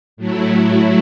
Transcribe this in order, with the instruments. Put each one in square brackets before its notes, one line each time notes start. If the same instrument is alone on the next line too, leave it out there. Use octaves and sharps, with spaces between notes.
[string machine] A2 F#3 A3 E4